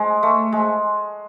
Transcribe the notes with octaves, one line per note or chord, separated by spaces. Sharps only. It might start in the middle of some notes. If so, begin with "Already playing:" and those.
Already playing: G#3
A3
G#3